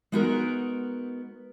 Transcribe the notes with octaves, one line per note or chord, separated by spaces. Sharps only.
G#3 B3 D#4 F#4 A#4